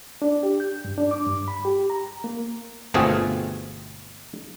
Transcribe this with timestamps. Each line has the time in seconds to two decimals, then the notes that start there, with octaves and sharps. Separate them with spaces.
0.22 D4
0.43 G4
0.60 G6
0.85 G2
0.98 D4
1.11 D6
1.26 G2
1.48 B5
1.65 G4
1.90 A#5
2.24 A#3
2.94 G1 B2 A3 C4 F4 G#4